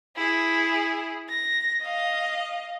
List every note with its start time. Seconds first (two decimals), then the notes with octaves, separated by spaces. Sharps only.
0.16 E4 G#4
1.29 A#6
1.82 D#5 F5